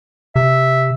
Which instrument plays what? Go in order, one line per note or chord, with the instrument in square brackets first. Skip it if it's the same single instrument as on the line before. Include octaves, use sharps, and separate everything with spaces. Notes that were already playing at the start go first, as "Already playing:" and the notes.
[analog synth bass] C3 [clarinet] E5